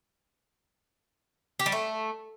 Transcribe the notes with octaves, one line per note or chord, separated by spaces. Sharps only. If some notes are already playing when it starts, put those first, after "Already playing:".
G4
G3
A3